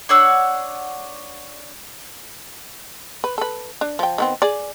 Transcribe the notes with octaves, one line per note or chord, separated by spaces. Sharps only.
D4 C#5 F#5 E6
B4
A4 B4
D4
F3 G5
D#3 B3 C4
G#4 D5